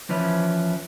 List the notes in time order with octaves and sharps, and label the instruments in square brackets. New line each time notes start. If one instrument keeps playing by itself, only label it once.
[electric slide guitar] E3 F3 C#4 B4 E5